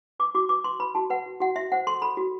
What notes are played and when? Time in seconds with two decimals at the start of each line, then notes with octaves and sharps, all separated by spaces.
0.19 B4 D6
0.35 F#4 D6
0.49 B4 D6
0.64 B4 C6
0.79 B4 B5
0.95 F#4 A5
1.10 B4 F#5
1.26 F#4
1.40 F#4 F#5
1.56 F#4 E5
1.72 C5 F#5
1.87 A4 C6
2.02 A4 B5
2.17 F#4